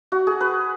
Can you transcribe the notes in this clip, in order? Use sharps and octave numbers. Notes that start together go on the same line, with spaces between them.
F#4
G#4
B4